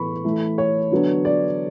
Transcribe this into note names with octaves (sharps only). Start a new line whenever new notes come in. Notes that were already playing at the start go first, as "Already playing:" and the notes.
Already playing: A2 E3 B3 B5 C#6
E3 A3 E4
C#5
D3 F#3 B3 D4
D5